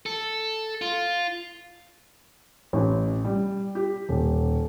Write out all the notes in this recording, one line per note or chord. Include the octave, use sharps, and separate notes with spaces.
A4
F4
A1
G3
G4
D#1